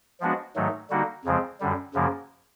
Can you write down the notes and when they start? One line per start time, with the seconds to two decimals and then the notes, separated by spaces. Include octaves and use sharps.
0.20 F3 G#3 B3 D4 F#4
0.56 G#2 D#3 F#3 A3
0.90 D3 G3 A#3 D#4 F#4
1.25 F2 C#3 F3 G#3 C4
1.61 F#2 D3 G3
1.94 F#2 C#3 F3 A#3